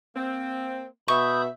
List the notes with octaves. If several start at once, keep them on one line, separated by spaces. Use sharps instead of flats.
A#3 C4
B2 E5 B5 C#6 D#6 G6